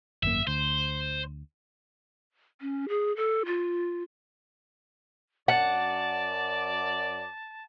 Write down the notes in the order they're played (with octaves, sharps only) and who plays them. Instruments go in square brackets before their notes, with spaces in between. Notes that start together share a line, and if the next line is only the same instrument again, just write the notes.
[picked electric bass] G#1 F#2 A#3 [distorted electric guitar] E5
[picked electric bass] D2 [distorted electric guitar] C5
[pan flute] C#4
G#4
A4
F4
[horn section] F#2 D5 [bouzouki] F#5 [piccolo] A5